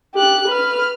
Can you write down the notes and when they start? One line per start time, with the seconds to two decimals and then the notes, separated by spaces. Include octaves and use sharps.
0.14 G4 F#6
0.48 B4 F6